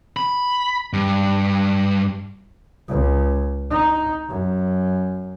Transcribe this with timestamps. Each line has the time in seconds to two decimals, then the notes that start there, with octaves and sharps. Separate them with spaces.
0.17 B5
0.93 G2
2.89 C#2
3.70 D#4
4.29 F#2